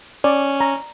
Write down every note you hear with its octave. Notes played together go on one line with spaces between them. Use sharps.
C#4 D5
A#5